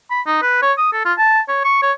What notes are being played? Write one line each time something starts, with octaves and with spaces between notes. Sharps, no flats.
B5
D#4
B4
C#5
D#6
A4
F4
A5
C#5
C#6
C#5